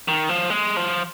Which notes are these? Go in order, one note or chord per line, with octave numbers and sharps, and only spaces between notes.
D#3
F3
G#3
F3